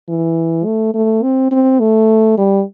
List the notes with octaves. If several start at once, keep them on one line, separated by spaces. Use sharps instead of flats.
E3
A3
A3
C4
C4
A3
G3